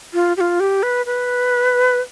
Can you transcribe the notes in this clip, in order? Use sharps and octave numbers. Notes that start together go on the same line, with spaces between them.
F4
G4
F4
G4
B4
B4